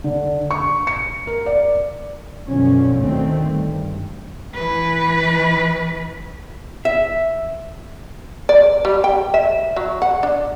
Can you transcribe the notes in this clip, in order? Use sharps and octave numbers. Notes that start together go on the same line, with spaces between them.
D3
C#6
C#7
A#4
D5
F#2 B2 D3 F3 C#4
D2 D3 D#3 A3 C4
G2
E3 B4
E5
D5
G3
G5
E5
F#3
F#5
D4